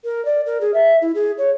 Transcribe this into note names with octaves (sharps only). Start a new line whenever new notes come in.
A#4
D5
A#4
G#4
E5
E4
G#4
C#5